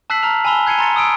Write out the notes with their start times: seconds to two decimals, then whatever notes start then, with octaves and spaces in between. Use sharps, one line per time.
0.10 A5 E6 F#6 B6 C7 F#7
0.23 A5 A#5 F6 F7
0.45 G#5 A5 B5 E6 F7 G7
0.66 F#6 G#6 C7 C#7 D#7 G7
0.79 A#5 C6 A6 C#7
0.96 D#6 E6 D7